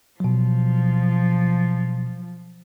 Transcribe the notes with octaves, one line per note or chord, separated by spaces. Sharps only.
B2 F3 F#3